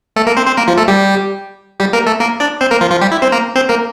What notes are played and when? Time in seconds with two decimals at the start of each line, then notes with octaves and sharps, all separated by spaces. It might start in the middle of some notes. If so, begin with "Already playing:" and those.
0.16 A3 A4
0.26 A#3 A#4
0.37 C4 C5
0.47 C4 C5
0.57 A#3 A#4
0.68 F3 F4
0.78 A3 A4
0.88 G3 G4
1.80 G3 G4
1.93 A#3 A#4
2.06 A3 A4
2.20 A#3 A#4
2.40 D4 D5
2.61 C4 C5
2.71 A#3 A#4
2.81 F3 F4
2.91 F3 F4
3.02 G3 G4
3.12 E4
3.22 C4 C5
3.32 A#3 A#4
3.55 C4 C5
3.69 A#3 A#4